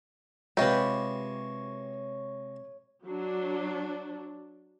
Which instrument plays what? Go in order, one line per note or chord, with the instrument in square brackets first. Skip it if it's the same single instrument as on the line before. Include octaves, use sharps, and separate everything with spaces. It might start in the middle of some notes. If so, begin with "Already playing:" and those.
[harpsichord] C3 G#3 [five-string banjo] F4 G4 [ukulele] B4 D#5 [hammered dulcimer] C#5
[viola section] F#3 D4